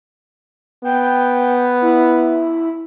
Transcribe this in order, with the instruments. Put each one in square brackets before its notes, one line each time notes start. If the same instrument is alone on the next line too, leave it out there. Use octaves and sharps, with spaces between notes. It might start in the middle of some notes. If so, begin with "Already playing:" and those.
[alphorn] B3 [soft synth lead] G5
[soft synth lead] E4